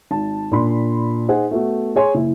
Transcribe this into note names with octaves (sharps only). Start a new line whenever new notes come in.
G#1 A5
A#2 D4 B5 C6
D#4 G#4 C5 F#5 G#5
A3 B3 F#4
G#4 C#5 G#5 C6
F#1 E4